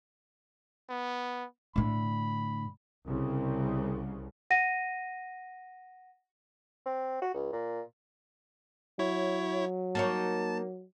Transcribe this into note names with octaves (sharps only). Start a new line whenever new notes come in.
B3
A2 D3 B5
C2 C#3
F#5 A#6 D#7
C4
F#4
C#2
A#2
F#3 E4 C#5
A#3 D#4 C#5 A5